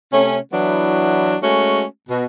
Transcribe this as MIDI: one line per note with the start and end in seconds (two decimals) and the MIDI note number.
0.12 0.38 48
0.12 0.38 57
0.12 0.38 61
0.53 1.36 52
0.53 1.36 54
0.53 1.36 59
0.53 1.36 62
0.53 1.36 64
1.43 1.84 56
1.43 1.84 57
1.43 1.84 61
1.43 1.84 66
2.10 2.26 47